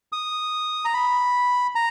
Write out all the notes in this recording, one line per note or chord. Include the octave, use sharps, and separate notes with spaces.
D#6
A#5
B5
A#5